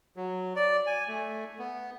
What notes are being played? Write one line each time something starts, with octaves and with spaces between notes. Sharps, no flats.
F#3
D5
G#5
A3
B3